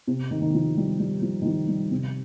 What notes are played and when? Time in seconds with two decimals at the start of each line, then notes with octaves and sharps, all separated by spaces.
0.07 C3
0.31 D#3
0.42 D#3
0.54 F3
0.77 G3
0.99 G3
1.22 F3
1.42 D#3
1.45 F3
1.68 G3
1.91 C3